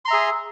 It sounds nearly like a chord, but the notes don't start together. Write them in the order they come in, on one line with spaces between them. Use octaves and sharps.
C6 A#5 E5 G#4